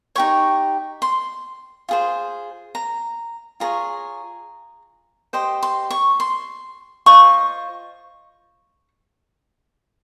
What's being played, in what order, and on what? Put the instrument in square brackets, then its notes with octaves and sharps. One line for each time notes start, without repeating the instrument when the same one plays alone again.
[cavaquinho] D#4 G4 C#5 C#6
C6
F4 G#4 C5
A#5
F4 G#4 C#5 A#5
G4 C5 D#5 C6
C6
C#6
C6
F4 C5 D#5 C#6